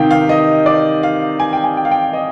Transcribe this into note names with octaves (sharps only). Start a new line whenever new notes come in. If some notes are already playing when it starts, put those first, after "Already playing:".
Already playing: C3 D#3 F5 G5
F5
D#5
D5
F5
G#5
G5
G#5
G5
F5
G5
D#5